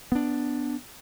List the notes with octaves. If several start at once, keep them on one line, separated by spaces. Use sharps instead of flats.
B3 D4